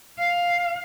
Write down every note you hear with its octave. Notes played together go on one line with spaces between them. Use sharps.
F5